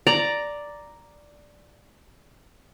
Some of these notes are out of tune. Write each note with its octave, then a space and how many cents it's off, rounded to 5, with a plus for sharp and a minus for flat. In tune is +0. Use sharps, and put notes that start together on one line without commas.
D5 +0 A#5 +0